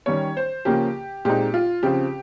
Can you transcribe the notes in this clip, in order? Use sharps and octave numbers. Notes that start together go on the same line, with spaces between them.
D#3 G3 C#4 C#5
C5
C#3 F3 A#3 C#4 G4
A#2 G#3 C4 D#4 G4
F4
C#3 F3 C4 G4